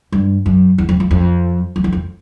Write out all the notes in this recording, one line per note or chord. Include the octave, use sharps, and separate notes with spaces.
G2
F#2
E2
F2
F2
F2
F2
E2
F2